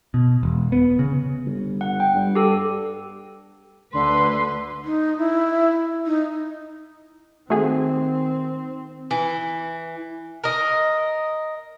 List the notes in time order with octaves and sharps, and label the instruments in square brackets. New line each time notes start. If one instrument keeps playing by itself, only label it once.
[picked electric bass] B2
E1
B3
C#3
[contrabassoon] G1
[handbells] F#5
G5
[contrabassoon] G2
[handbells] G4 A4
[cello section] D2 B4 [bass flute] D3 [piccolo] C6
[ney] D#4
E4
D#4
[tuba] D#3 [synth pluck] A3 F#4 G#4 [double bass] C4
[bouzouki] E3
A#4 D#5